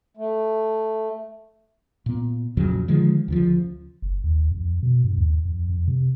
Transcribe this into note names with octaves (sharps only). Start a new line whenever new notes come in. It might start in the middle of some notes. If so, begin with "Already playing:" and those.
A3
A#2 B3
F2 A#2 C#3 F#3
D3 D#3 F3 G#3
D2 C#3 F3
F#1
D#2
F2
B2
G2
D#2
F2
F2
C3